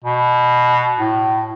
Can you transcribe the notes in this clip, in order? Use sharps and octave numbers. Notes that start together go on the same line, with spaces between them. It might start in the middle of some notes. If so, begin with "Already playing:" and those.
B2
A2